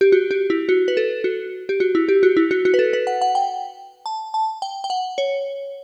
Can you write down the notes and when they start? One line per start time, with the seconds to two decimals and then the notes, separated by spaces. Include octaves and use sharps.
0.01 G4
0.12 F#4
0.31 G4
0.50 E4
0.69 F#4
0.88 B4
0.97 A4
1.24 F#4
1.69 G4
1.80 F#4
1.95 E4
2.09 G4
2.23 F#4
2.37 E4
2.51 F#4
2.65 F#4
2.74 B4
2.79 A4
2.93 B4
3.07 F#5
3.21 F#5
3.35 G5
4.06 A5
4.34 A5
4.62 G5
4.84 G5
4.90 F#5
5.18 C#5